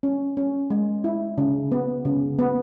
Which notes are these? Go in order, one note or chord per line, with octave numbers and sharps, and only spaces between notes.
C#4
C#4
G#3
E4
C#3
B3
C#3
B3